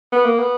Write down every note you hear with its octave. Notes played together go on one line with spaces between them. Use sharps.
B3
A#3
B3